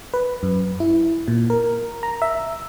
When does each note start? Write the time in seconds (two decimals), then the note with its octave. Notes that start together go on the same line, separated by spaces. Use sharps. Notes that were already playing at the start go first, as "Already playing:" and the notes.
0.14 B4
0.43 F#2
0.80 E4
1.28 A#2
1.50 A#4
2.03 A#5
2.22 E5